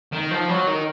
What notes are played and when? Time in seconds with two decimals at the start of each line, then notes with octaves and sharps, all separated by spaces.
0.13 D#3
0.31 F3
0.49 F#3
0.67 D#3